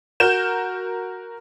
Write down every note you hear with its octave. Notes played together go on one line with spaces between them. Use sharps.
F#4 A#4 G6 E7